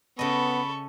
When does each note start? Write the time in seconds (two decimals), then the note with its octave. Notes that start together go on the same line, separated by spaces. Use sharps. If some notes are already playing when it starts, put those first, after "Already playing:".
0.19 C#3 B3 A4 D#5 B5 C#6